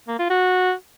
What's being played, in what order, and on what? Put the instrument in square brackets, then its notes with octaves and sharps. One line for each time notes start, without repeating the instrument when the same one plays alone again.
[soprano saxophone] A#3
F4
F#4